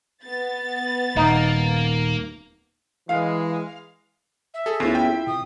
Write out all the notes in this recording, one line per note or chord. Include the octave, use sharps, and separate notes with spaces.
B3 A6
D#1 A#3 D#4
E3 G#3 F5
E5
G#4 A4
D2 B3 C#4 E4 F4 G#4 C7
G5
C3 D#6